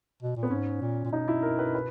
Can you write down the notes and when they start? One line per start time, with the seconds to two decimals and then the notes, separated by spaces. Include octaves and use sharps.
0.23 B2
0.36 A#2
0.43 B3
0.50 G#2 C#4
0.81 A#2
1.05 A#2
1.12 B2 D#4
1.28 E4
1.42 A#4
1.58 B4
1.75 B4